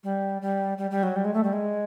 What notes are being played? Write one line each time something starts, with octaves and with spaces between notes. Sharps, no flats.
G3
G3
G3
G3
F#3
G3
G#3
A3
G3
G#3